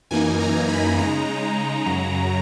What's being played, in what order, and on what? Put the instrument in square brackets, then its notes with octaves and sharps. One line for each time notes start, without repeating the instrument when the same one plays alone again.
[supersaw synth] F#2 E3 A#3 D#4 G#5
A#5
B5
C#3 G#3 D#4 A#5
F#2 C#3 F#3